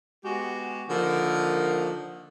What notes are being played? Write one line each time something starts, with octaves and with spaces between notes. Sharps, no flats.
G#3 B3 F#4 G4
D3 D#3 F3 A#3